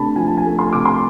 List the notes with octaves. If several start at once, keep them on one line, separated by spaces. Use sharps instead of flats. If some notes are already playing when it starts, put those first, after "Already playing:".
Already playing: C3 A3 D4 A5 B5
F3 G#5
A5
G#5
A3
C6
C3 D6
C6